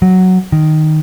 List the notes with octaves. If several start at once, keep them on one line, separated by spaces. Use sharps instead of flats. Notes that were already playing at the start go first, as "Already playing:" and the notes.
F#3
D#3